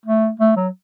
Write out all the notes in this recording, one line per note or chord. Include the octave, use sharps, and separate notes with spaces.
A3
A3
F#3